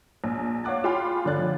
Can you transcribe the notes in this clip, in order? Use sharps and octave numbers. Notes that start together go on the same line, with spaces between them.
A#1
C#5 F5 F#5 D6 F#6 A6
F4 G#4 G5 B5 F6
G1 D3 D4 F#6 A6
D3 F3